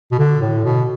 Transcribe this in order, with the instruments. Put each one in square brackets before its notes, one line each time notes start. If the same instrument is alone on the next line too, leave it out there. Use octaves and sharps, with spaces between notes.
[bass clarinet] B2
D3
A2
B2